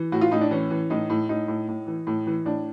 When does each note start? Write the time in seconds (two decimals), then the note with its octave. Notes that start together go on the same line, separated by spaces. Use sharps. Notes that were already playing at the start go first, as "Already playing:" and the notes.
Already playing: E3
0.12 A2 F#4
0.21 F4
0.31 A2 D#4
0.41 D4
0.51 E3 C#4
0.70 E3
0.90 A2 D#4
1.10 A2
1.29 A2 D#4
1.48 A2
1.68 A2
1.87 E3
2.07 A2
2.26 E3
2.45 A2 D4